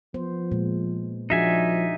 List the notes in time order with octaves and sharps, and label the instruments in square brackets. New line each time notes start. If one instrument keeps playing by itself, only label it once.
[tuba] F3 [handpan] B3 C5
[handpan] A#2 G#3
[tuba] F3 [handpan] D4 F#4 G#4 [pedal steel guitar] D#4 E5 G#5